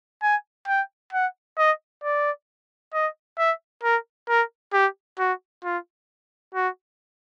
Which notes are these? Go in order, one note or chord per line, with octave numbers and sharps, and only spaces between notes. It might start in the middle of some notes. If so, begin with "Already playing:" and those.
G#5
G5
F#5
D#5
D5
D#5
E5
A#4
A#4
G4
F#4
F4
F#4